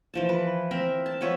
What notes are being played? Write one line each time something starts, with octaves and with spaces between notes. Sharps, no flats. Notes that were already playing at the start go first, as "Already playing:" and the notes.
E3 F3 A5
B4
C4 A#4 E5
A5
F3 B3 C#5 E5